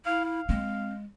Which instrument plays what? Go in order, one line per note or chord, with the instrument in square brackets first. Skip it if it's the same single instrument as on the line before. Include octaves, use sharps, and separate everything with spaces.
[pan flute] E4 [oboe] F5
[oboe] F5
[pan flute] G#3 [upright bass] C4